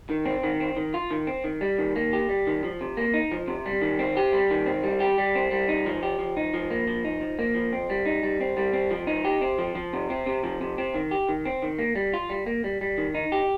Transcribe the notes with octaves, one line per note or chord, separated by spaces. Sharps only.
D#3
C4
D#3
C4
D#3
F4
D#3
C4
D#3
G3
D#3
A#3
G4
G3
D#3
F3
C3
A#3
D#4
F3
C3
G3
D#3
C4
G4
G3
D#3
C4
G3
G4
G3
C4
G3
D#4
F3
G4
F3
D#4
F3
A#3
F3
D#4
F3
A#3
F3
C4
G3
D#4
G3
C4
G3
C4
F3
D#4
G4
C4
F3
F3
C3
C4
C3
F3
C3
C4
D#3
G4
D#3
C4
D#3
A#3
G3
F4
G3
A#3
G3
G3
D#3
D#4
G4